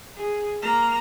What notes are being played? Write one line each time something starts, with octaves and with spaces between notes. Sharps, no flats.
G#4
A#3 A#5